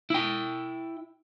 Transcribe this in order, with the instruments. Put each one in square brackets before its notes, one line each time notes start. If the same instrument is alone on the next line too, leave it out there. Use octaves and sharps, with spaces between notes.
[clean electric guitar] E4 G5